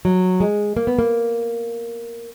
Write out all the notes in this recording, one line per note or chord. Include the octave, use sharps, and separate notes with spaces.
F#3
G#3
A#3
B3
A#3